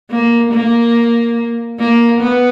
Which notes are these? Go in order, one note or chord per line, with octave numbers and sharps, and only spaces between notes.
A#3
A#3
A#3
B3